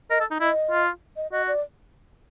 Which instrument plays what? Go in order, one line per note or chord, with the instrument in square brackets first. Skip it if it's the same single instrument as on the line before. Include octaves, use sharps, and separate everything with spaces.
[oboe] A#4 [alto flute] D#5
[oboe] A4
D#4
[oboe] E4 [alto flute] D#5
[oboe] F4
[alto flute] D#5
[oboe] F#4 [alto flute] D#5
[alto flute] D5